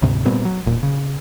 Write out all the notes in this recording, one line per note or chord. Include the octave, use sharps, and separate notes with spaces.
D2 G#2 C3
A#2 G3 B3 C4
F#3
E1 A#2
C#3